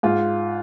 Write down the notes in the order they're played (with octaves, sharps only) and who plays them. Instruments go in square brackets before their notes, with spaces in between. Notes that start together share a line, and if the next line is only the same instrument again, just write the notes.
[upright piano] G#2 F4